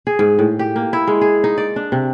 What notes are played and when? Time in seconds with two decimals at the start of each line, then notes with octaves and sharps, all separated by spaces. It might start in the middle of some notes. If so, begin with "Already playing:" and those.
0.07 G#4
0.19 G#2
0.39 A2
0.59 G4
0.76 A#3
0.93 E4
1.07 G#3
1.21 G#4
1.44 D#4
1.58 D5
1.76 D4
1.92 C3